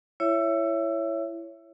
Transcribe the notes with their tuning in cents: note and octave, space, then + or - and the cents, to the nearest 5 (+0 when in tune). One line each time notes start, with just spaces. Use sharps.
E4 +20 C#5 +0 E5 +10